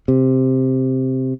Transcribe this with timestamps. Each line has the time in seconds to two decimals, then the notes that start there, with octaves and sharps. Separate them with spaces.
0.08 C3